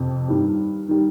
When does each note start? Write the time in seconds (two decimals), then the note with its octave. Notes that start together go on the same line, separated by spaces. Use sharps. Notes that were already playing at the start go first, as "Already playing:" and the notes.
Already playing: F2 C3 C4
0.28 G2 D#3 G3
0.88 D#3 G3